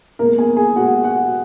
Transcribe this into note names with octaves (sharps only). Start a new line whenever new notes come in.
B2 G#3 A#3 A#4
G#4 G#5
G#4 G#5
B2 G#3 F#4 F#5
F#4 F#5